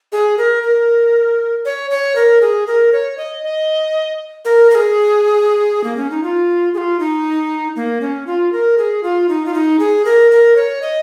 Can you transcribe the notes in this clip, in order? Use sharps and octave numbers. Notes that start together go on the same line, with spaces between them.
G#4
A#4
A#4
C#5
C#5
A#4
G#4
A#4
C#5
D#5
D#5
A#4
A#4
G#4
A#3
C#4
D#4
F4
G#4
F4
D#4
A#3
C#4
F4
A#4
G#4
F4
D#4
F4
D#4
G#4
A#4
A#4
C#5
D#5